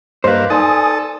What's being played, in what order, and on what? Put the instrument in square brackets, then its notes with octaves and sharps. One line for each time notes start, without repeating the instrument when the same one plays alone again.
[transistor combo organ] G2 A#3 [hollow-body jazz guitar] B4 C5 [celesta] D#5 F5
[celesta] D#4 D5 C6 [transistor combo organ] A4 [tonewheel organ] G#5 D#6